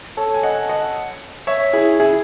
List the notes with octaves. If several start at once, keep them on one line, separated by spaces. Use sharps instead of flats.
A4 C#5
G#5
D#5 F#5
D#5 F#5
C#5 E5
E4 G#4
E4 G#4